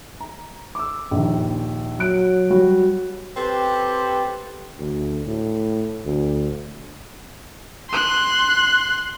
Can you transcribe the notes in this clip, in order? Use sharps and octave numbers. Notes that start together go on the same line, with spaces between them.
A#5
D6 E6
A#1 D#2
F#3 F#6 D7
G3 F#4
C4 G4 A4 B4 C5
D2
A2
D2
C6 F#6